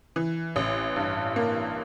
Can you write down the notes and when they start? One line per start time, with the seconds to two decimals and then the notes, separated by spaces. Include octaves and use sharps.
0.16 E3
0.56 A1
0.96 G2
1.36 A#3